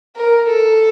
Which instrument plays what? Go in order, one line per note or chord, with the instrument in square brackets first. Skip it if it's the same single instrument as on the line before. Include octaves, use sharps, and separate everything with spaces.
[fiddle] A#4
A4